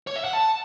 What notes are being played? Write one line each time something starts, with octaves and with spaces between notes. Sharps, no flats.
C#5
E5
F#5
A5